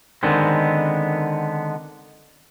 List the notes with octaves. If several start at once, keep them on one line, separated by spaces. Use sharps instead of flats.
D3 D#3 G#3 B3 C4